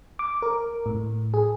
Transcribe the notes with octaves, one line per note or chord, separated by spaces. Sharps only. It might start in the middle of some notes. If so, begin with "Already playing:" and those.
D6
A#4
A2
G#4